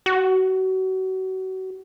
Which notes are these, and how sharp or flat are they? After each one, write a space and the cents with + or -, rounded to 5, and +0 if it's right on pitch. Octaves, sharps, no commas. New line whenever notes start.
F#4 +30